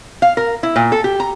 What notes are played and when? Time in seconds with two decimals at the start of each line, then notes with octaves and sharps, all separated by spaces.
0.22 F5
0.37 A#4
0.63 E4
0.76 A#2
0.92 A4
1.04 G4
1.20 A#5